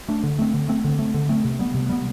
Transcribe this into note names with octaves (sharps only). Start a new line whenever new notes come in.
A3 D4
D3
A3 C4
D3
A3 C4
D3
A3 C4
D3
A3 C4
C3
G3 B3
C3
G3 B3